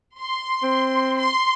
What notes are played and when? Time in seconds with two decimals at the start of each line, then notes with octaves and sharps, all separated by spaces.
0.19 C6
0.63 C4
1.18 C6